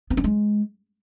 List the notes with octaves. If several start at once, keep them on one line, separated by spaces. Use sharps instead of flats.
B3
C#4
G#3